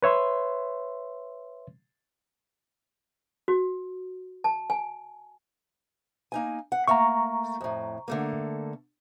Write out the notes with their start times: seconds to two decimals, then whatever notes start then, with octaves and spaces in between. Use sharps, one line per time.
0.03 B4 C#5 E5 C6
3.48 F#4
4.44 A5
4.70 G#5
6.32 A#3 D#4 G#5
6.72 F#5
6.88 A3 A#3 A#5 C#6
7.61 F2 A2
8.08 D3 A3 A#3